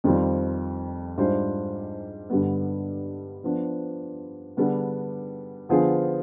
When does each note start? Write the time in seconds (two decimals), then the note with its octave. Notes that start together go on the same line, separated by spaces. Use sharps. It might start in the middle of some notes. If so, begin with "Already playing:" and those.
0.04 F2 D#3 G3 C4 F4
1.18 G#2 G3 D4 F4 C5
2.30 G2 D3 G3 B3
3.44 F3 B3 D4
4.57 D3 G3 B3 D4 G#4
5.69 D3 F3 B3 F4 G#4